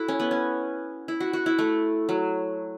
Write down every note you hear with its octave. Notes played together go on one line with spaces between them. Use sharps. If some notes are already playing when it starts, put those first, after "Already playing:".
Already playing: E4 F#4 A4
C#4
B3
C#4
E4
F#4
F#4
E4
A3
F#3